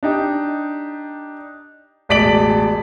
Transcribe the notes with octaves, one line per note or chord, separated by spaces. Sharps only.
D4 D#4 G4
E1 A1 D5 B6 D7 F#7